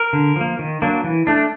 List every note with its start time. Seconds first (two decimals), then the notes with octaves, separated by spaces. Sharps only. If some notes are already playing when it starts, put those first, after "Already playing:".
Already playing: A#4
0.13 D3
0.36 F3 A#3
0.59 D#3
0.82 F#3 A#3 D4
1.04 E3
1.27 A3 D4